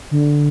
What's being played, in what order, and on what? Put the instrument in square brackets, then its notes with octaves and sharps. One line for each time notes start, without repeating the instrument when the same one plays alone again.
[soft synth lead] D3